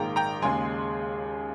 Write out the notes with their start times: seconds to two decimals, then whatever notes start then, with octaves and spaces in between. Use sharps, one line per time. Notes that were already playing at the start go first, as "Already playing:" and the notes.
Already playing: A#1 G#2 D#3 A#3 G5 A#5
0.16 G5 A#5
0.42 D#2 C#3 G#3 G#5 C6